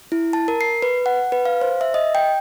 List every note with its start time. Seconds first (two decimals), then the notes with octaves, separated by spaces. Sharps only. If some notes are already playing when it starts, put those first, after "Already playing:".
0.12 E4
0.33 A5
0.48 A#4
0.61 C7
0.82 B4
1.06 F#5
1.32 B4
1.45 F5
1.61 C5
1.81 E5
1.94 D#5
2.15 G5